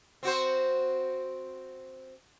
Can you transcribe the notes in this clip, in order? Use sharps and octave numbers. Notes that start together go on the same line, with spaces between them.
C4 F#4 C5